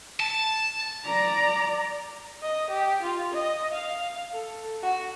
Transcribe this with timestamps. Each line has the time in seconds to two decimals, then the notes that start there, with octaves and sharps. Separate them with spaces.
0.20 A5
1.04 D5 A#5
2.42 D#5
2.70 G4
3.02 F4
3.33 D#5
3.73 F5
4.32 A4
4.83 F#4